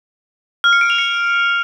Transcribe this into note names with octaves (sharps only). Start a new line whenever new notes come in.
F6
C#7
D7
F7
C#7